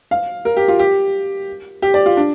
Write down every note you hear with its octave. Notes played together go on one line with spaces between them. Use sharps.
F5
A#4
G4
F4
G4
G4
D5
F4
D4